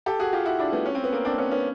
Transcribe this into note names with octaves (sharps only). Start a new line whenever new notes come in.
G4 A4
F#4 G#4
F4 G4
E4 F#4
D4 E4
A3 B3
C#4
C4
B3
A#3 C4
C4 D4
B3 C#4
B3 C#4